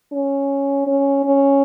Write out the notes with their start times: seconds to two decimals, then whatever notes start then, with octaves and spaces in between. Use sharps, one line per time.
0.12 C#4
0.87 C#4
1.24 C#4